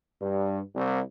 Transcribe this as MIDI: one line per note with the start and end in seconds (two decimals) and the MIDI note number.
0.22 0.60 43
0.76 1.01 36